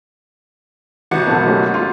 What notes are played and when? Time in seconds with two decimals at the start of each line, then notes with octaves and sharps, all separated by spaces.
1.11 G#1 C3 E3 F#4 C#7
1.27 F#1 B1
1.46 A3 C#4 G4
1.74 F4